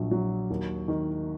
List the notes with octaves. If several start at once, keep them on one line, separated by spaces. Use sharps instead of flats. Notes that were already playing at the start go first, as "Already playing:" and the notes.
Already playing: A#1 F#3
F#3
D#2
D#3